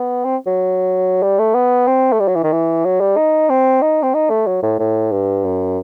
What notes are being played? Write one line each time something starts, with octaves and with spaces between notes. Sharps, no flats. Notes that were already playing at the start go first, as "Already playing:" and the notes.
Already playing: B3
C4
F#3
G3
A3
B3
C4
A3
G3
F#3
E3
D#3
E3
F#3
G3
D#4
C4
D#4
C4
D#4
A3
F#3
A2
A2
G2
F#2